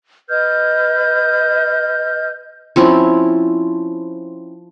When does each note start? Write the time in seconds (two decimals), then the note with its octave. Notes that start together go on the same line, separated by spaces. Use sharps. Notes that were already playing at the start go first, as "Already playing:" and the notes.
0.29 B4 D#5 F6 G6
2.76 F3 C4 C#4 E4